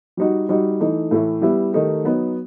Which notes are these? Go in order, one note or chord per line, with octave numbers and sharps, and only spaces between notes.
G3 D#4 F#4
G3 D#4 F#4
E3 A3 D#4
A2 E3 A3 E4
G3 B3 E4 G4
D#3 A3 D#4 G4
F#3 B3 D#4